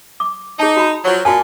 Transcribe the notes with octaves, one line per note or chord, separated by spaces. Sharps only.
D6
D#4 G#4 A5
F#4 A#5 B5
F3 F#3
A#2 F4 F#4 G#5 A5